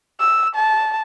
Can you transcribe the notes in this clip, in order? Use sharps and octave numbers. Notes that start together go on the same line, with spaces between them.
E6
A5